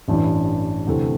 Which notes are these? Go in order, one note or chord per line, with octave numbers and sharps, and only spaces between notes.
A1 G2 E3
D2 C3 E3 A3 C4